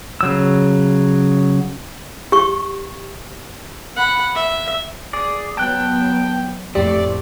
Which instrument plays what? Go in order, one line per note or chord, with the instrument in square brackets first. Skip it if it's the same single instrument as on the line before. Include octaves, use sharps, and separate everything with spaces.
[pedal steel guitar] C#3 F#3 E6
[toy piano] G4 C#6
[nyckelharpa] F#5 B5
E5
[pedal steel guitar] G#4 D5
[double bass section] F#3 B3 [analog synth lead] G5 [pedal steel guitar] A5 F#6
[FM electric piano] F2 G4 [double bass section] A2 [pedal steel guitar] A3 C4 [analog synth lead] D5